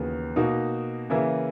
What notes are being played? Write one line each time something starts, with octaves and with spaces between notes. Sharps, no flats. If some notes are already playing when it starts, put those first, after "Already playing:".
Already playing: D#2 C#3 E3 B3 F#4
B2 A#3 D#4 F#4
C#3 E3 A#3 E4